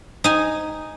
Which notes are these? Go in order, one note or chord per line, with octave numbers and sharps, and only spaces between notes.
D#4 G#5